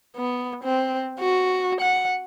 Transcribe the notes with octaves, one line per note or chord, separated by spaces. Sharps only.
B3
C4
F#4
F#5